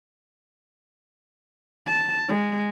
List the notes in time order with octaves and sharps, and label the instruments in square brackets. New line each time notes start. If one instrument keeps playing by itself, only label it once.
[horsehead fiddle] A5
G#3